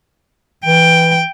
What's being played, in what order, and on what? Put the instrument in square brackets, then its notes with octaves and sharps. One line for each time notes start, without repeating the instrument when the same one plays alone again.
[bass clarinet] E3 [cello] G5